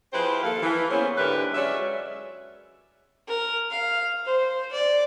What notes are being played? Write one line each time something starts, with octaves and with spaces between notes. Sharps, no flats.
F3 E4 G4 G#4 B4 C5
D#2 A#3 A4 F5
E3
A#3 B3 C#4 G#4 C5
G#2 D3 E4 G4 A#4 B4
F#3 G#3 C#4 D5 E5
A#4
F5
C5
D5